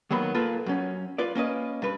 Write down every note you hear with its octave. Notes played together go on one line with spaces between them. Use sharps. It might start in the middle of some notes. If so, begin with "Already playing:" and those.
D#3 F#3 A#3 B3 B5
A#2 A#3 F4 A4 B4
F#2 C#4
F4 B4 D5
A#3 C#4 B4 D#5
G2 B4